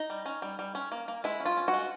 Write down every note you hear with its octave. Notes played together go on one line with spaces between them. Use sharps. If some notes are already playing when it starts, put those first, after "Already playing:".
Already playing: D#4
G3
C#4
G3
G3
C#4
A#3
A#3
G#3 E4
C#4
F4
C#4
F#4
G#3